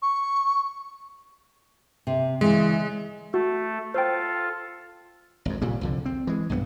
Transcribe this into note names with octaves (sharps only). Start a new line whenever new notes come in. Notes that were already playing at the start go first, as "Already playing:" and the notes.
C#6
C3
C#3 E3 G#3
A3 F#4 A4
F4 A4 C5 G5
G#1 F2
A#2 C#3 G3
C2 F2 D3
C4
E3 G#3
B1 G2 D#3 B3